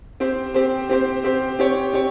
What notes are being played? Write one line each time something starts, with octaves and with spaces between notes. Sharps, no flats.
C4 G4 C5
C4 G4 C5
C4 G4 C5
C4 G4 C5
C4 G4 C#5
C4 G4 C#5